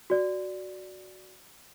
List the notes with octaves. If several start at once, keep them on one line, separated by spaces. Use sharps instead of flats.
F#4 D5